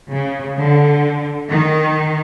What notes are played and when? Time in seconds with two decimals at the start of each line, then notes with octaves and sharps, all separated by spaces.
0.11 C#3
0.57 D3
1.50 D#3